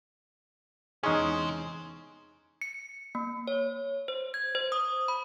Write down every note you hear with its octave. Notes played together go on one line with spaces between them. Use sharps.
E2 C3 G#3 C#4 D#4 G#4 C5
C#7
A#3
C#5
C5
G#6
C5
D#6
B5